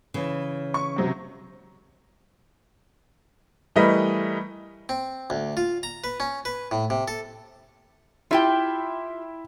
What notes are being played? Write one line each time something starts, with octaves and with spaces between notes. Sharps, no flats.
C#3 E3
C#6
C3 F#3 C4
E3 G3 A3 A#4 B4 D#5
C4
D2
F4
A#5
B4
C#4
B4
A2
C3
A4
E4 F4 G4 E5 G5 C6